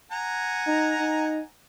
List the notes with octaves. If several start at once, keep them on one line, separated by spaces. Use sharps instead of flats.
F#5 G#5 A#5
D#4
D#4